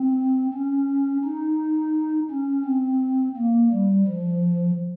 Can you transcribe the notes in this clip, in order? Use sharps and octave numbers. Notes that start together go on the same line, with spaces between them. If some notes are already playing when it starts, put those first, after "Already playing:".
Already playing: C4
C#4
D#4
C#4
C4
A#3
G3
F3